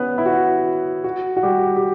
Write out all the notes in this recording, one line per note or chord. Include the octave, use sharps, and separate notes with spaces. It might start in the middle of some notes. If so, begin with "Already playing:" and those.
Already playing: B3 C#4 B4
E4
F#4
F#4
F#4
G3 G4
G4